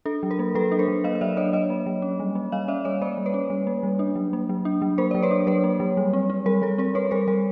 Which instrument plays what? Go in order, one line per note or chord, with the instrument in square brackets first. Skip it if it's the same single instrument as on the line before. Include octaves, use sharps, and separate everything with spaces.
[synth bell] D4 A4
F#3
A#4
A#3
F#3 A4 B4
D4
A#4 C5
F#3
A#3 D#5 F5
D#5
F#3 D5 E5
D4 C#5 D#5
F#3 C#5 D#5
A#3
F#3
C#4
G3
A#3
G3 D#5 F5
C#4 D5 E5
G3 C#5 D#5
A#3 C5 D5
G3
B4 C#5
C#4
G3
A#3
G3
D4
F#3
A#3
F#3
D4
F#3
A#3 A#4 C5
F#3 D5
B4 C#5
D4
F#3 B4 C#5
A#3
F#3
G3
C4
C4
G3 A#4
G3 A4
C4 A#4
C4 B4 C#5
G3 A#4 C5
G3 A#4